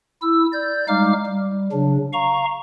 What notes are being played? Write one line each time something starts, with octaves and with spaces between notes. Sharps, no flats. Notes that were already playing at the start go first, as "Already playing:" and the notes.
E4 E6
D5 G6
G3 G#3 D#4 F5 D6 F6
G3
C#3 F#3 D4
F5 A#5 C#6